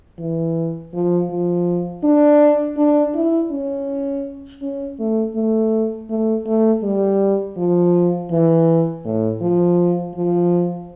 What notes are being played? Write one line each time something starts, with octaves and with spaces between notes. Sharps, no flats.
E3
F3
F3
D4
D4
E4
C#4
C#4
A3
A3
A3
A3
G3
F3
E3
A2
F3
F3